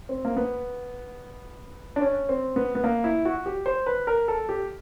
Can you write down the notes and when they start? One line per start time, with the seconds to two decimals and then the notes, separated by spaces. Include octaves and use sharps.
0.09 C4
0.25 A#3
0.36 B3
1.96 D4
2.01 C#4
2.29 C4
2.56 B3
2.75 B3
2.84 A#3
3.04 E4
3.25 F#4
3.46 G4
3.66 C5
3.86 B4
4.07 A#4
4.28 A4
4.49 G4